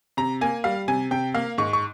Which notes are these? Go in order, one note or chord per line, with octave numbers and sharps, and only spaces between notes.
C3 A#5
A#3 G#5
G3 F5
C3 G#5
C3 G5
A#3 F5
G#2 C#6
C#6